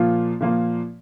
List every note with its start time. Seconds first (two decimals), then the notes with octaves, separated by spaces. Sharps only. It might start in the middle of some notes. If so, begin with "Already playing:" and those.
Already playing: A#2 F3 A#3 F4
0.40 A#2 F3 A#3 F4